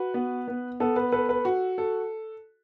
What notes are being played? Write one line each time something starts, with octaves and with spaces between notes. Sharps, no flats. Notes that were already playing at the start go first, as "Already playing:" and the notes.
Already playing: F#4 B4
B3
B3
B3 A4
B4
A4 B4
B4
F#4
A4